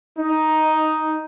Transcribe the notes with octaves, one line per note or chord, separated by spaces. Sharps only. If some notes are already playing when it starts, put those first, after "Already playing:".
D#4